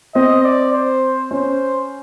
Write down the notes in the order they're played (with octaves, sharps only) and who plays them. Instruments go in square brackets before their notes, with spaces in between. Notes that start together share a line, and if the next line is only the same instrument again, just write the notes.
[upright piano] C4 [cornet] D#5
[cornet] D5
C5
[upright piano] C#4 [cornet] C5